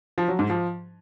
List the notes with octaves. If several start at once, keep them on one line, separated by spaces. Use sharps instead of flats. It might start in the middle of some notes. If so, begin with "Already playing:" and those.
F3
F#3
G#2
F3